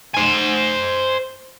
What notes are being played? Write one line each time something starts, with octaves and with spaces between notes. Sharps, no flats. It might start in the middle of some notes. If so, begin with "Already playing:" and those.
C5 G#5